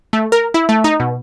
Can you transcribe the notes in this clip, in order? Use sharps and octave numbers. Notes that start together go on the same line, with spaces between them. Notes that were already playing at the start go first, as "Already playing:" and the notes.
A3
A#4
E4
A3
D#4
B2